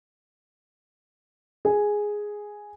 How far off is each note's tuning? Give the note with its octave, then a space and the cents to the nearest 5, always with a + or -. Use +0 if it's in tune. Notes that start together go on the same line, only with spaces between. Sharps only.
G#4 +0 G#5 +0